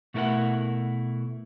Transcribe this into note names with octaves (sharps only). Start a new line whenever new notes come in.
B2 A3 E4 A4 A#4 F#5